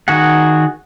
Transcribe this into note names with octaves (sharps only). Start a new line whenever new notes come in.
D#3 F#4 G#4 F#5